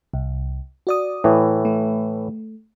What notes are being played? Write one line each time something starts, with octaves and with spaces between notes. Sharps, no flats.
C2
F#4 D5 D#6
A2 E3
A3